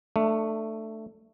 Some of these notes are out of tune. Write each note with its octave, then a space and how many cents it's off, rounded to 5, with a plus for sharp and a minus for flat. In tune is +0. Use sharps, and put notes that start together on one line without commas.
A3 +10 D4 +30